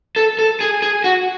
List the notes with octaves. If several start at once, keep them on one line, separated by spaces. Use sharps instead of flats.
A4
A4
G#4
G#4
F#4